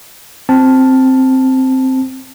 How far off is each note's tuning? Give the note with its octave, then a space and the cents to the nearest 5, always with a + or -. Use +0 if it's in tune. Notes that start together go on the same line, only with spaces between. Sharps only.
C4 +0 A5 +0